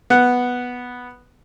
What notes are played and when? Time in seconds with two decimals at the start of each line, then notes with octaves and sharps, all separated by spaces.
0.10 B3 F#5